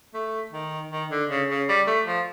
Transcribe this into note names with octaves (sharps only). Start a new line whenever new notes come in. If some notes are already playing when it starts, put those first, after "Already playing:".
A3
D#3
D#3
D3
C#3
C#3
G3
A3
F3